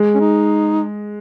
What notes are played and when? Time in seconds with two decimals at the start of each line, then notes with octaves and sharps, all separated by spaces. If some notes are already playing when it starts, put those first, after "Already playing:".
Already playing: G#3
0.15 C#4
0.21 D#4